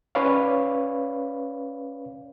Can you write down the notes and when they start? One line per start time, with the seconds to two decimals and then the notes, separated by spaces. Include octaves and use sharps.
0.15 C#4 B4 C#5 D5 F5